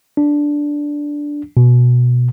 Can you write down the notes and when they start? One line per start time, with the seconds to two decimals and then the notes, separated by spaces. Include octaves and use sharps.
0.17 D4
1.57 B2